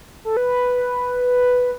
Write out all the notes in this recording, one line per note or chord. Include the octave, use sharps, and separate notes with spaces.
A4
B4